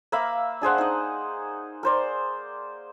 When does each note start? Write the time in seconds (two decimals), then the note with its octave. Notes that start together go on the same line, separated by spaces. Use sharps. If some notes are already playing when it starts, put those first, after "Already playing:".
0.12 A#3 E5 F5 B5
0.62 D4 G#4 C5 F#5
0.78 D#4 D#5
1.83 A#4 C5 D5